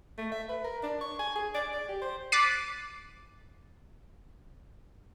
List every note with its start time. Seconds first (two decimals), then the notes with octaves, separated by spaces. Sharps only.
0.18 A3
0.32 E5
0.49 B4
0.64 A#4
0.83 D4
1.01 C#6
1.19 G#5
1.36 G#4
1.54 D5
1.73 D5
1.89 G4
2.01 C5
2.32 D6 F#6 A6 B6 C7 D#7